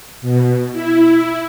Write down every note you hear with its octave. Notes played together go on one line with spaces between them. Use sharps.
B2
E4